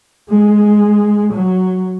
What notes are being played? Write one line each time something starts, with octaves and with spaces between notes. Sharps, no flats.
G#3
F#3